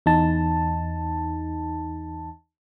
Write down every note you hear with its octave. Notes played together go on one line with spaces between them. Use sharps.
E2 D#4 A5